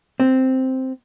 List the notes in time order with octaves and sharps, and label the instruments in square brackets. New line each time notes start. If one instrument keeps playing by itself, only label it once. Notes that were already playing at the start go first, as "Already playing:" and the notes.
[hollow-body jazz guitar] C4